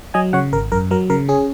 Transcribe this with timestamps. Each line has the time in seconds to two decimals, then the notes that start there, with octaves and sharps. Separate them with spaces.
0.14 F#3 D#5 G#5
0.33 C#3 C#5 F#5
0.53 G#1 A#4
0.72 F#2 A#4
0.91 F#3 A#4
1.10 C#3 A#4
1.29 C#4 G#4